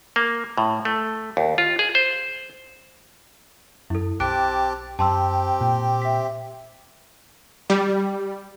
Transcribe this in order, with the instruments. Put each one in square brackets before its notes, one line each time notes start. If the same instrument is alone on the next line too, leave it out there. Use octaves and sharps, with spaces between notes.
[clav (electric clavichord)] A#3
A2
A3
D#2
F4
G#4
C5
[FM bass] F#2 [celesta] E4 A4
[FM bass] B1 [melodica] C4 G4 A5 [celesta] D6 F#6 D7
[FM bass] F#2 [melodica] C4 G4 [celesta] A5 C6 E6
[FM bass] A#2
[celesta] E5 B6
[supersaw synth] G3